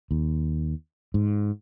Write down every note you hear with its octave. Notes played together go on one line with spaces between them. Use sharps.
D#2
G#2